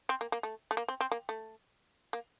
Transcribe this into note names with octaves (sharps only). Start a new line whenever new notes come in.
C4
A#3
A#3
A3
A3
A#3
C4
C4
A#3
A3
A#3